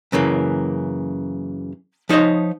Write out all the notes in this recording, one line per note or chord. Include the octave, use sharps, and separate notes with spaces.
F#2 C#3 E3 A#3
F3 D#4 C5 C#5 D#5